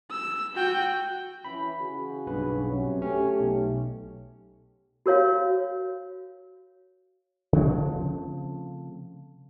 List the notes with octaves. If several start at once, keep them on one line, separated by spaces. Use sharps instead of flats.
E6
F#4 G5
E3 C#4 B5
C#3 F#4 G#4
B1 G2 B4
C3 F#3 C#4
A3 C#4 G4
B1
F#4 A#4 C#5 F5
C#3 F3 A3 C4